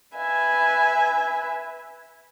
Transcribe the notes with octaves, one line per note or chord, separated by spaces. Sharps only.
B4 E5 G#5